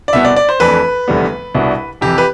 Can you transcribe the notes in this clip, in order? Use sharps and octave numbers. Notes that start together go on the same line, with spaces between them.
D5
C2 B2 B3 E5
D5
D5
C5
F2 E3 A3 D4 B4
F1 E2 D3 G3 B3
C2 B2 B3 D4
F2 C3 E3 G4
B4